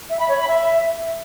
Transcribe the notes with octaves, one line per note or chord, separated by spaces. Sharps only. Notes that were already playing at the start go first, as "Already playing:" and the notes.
E5
B5
C#5
B5
E5